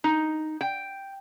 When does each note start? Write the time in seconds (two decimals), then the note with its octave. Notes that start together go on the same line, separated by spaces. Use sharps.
0.04 D#4
0.61 G5